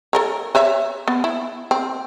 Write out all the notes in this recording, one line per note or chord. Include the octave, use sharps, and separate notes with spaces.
A4 A#4 C#5
B4 C#5 E5
B3
E4
C4